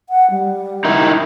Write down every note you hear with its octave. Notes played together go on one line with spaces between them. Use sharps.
F#5
G3
D#4 E4 A#4